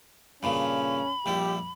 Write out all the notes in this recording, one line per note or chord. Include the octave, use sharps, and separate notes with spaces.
G2 A#2 C#3 C#4 B5
A#1 G3 E4 G4